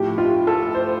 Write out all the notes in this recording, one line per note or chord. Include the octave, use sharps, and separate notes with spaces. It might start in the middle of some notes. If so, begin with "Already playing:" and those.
Already playing: A2 F3 G4
F4
A4
C5